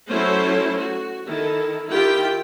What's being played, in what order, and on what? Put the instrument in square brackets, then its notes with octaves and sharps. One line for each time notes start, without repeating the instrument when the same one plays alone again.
[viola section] F#3 A3 C#4 E4 A4 C5
F#4
D#3 E4 A4
D#3 E4 F4 G4 G5